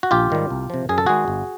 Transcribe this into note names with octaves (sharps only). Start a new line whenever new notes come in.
F#4
A#1 F4 G4
G#2 D#3 G3
C2
C3 F3
F#2 G#4
A4
D#3 G#3 F#4 G#4
G1